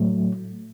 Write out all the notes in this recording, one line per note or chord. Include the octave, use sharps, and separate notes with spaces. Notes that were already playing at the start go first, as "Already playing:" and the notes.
Already playing: A2 F#3 A3